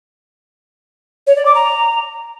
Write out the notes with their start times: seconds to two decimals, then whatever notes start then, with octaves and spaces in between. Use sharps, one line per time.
1.27 C#5
1.36 D5
1.45 D6
1.55 A#5